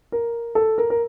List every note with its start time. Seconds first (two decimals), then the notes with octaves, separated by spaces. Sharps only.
0.12 A#4
0.55 A4
0.78 A#4
0.90 A#4